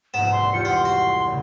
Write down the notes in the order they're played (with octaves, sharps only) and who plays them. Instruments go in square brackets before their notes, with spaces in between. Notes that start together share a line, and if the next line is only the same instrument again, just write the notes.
[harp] A#1 G#2 [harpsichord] B3 [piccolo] E7
[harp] C2 [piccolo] C6
[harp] E2 F4 G4 [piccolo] C#7
[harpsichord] B3 [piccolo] C6
[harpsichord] F#4 [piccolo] C6
[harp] A2 C#3